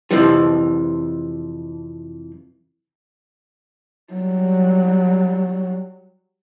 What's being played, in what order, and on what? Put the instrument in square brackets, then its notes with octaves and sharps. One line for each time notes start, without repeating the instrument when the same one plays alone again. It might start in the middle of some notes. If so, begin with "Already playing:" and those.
[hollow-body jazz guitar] F2 C3 E3 F3
[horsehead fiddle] F#3 G3